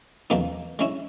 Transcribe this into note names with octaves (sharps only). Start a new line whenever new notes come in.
E2 C3 F3 A#3 D#4
G#3 C#4 E4